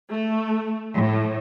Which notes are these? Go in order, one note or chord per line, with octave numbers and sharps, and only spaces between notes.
A3
A2